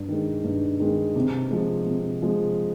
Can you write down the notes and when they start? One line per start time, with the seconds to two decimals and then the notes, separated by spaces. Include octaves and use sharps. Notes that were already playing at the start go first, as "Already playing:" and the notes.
Already playing: G2
0.08 D#3 G#3
0.44 G2
0.80 D#3 G#3
1.16 C3
1.51 F3 G#3
1.86 C3
2.22 F3 G#3